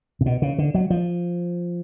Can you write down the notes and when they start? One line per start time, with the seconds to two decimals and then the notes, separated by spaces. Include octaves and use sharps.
0.21 C3
0.26 B2
0.42 C#3
0.58 D3
0.74 F#3
0.90 F3